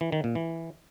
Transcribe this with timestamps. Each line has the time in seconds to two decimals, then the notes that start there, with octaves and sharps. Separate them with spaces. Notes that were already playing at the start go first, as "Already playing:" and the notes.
0.01 E3
0.12 D#3
0.24 A#2
0.35 E3